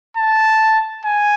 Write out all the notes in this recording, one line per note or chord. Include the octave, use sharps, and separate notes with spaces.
A5
G#5